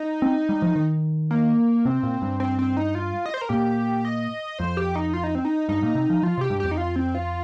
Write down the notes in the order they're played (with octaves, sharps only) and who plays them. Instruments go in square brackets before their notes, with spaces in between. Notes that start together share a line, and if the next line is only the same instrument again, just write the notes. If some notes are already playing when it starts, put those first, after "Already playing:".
Already playing: [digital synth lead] D#4
[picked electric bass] C4
G3
F3
D#3
[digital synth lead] A#3
[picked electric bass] C3 [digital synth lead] C4
[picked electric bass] A#2
G2
[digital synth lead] C4
C4
D#4
F4
D#5
C5
A#4
[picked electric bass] A#2 [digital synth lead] G4
[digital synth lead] D#5
[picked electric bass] F2 [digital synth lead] C5
[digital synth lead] G4
D#4
F4
D#4
C4
D#4
[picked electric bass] G2 [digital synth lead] D#4
[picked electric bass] A#2
C3
F3
[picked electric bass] F3 [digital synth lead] F4
[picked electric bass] C3 [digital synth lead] G4
[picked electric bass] G2
[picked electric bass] F2 [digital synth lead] G4
[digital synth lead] D#4
F4
C4
F4